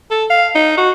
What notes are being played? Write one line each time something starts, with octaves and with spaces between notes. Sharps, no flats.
A4
F5
D#4
F#4